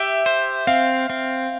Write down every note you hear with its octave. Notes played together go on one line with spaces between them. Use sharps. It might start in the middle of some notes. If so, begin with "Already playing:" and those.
Already playing: G4 E5
C5
C4 F5
C4